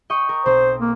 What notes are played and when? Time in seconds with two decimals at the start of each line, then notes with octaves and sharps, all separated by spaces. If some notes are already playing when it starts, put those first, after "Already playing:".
0.10 D#5 G5 C#6
0.29 A#4
0.46 B1 C4 C5
0.80 A#3